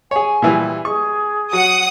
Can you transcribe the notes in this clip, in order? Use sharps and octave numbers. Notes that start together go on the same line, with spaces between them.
G#4 C#5 G#5
A#2 E3 G3
G#4 C#6
F#3 F#5 D#6